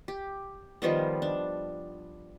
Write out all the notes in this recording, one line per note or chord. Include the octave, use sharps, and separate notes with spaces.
G4
D#3 F3 G3 B3
D4